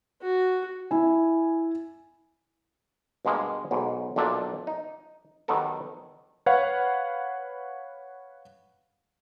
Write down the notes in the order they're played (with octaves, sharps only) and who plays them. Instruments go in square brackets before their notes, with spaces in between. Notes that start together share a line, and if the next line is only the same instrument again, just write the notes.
[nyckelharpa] F#4
[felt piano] E4 G#5
[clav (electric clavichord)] G2 B2 G#3 A#3 D#5 G#5
B1 G#2 B2
B1 A#2 D4 A4 E5 A5
D#4
D#3 F#3 B3 G4 A4 A#4
[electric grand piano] B4 C#5 F5 F#5